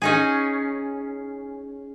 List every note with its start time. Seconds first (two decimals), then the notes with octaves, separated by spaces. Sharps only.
0.02 C#4 D#4 G#4